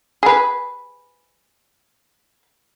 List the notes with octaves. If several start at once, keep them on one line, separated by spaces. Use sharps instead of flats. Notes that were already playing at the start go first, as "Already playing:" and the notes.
G#4 B4